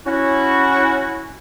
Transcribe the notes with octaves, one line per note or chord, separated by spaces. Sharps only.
C#4 E4 F#4